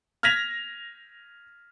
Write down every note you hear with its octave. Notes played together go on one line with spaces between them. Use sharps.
F6 G#6 A#6 B6 F7